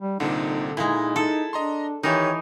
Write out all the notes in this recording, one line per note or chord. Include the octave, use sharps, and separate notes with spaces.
G3
C2 A#2 D3 C4 D#4
A#2 G#3 D#4 E4
D#4 A4
D4 D#5 A#5 C6
D#3 E3 D#4 G4 C#5